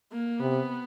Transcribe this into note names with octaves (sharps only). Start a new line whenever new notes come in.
A#3
C3 B3